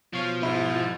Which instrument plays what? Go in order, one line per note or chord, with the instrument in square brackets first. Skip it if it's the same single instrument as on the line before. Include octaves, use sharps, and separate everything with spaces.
[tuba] B2 [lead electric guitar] F3 [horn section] C#5 F5
[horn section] G#2 [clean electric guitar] E4